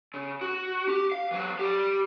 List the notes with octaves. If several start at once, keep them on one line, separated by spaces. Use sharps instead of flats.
C#3
F#4
G4
F5
E3 F#3
G4 D5